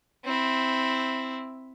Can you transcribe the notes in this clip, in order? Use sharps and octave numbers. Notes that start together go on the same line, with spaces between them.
C4 E4